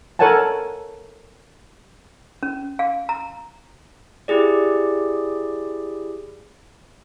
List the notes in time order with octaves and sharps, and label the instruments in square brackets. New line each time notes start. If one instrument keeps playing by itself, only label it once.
[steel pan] A4 A#4 C#5 F#5 G#5 A5
[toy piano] C#4
F5
A#5
[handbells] E4 G4 G#4 D5